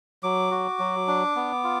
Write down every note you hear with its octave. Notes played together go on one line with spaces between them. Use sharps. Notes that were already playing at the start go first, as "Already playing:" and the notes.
F#3 D6
F#4
F#3
D4
B3
F4